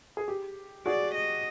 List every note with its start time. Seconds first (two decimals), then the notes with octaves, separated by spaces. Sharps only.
0.17 G#4
0.28 G4
0.86 F#4 G#4 D5
1.14 D#5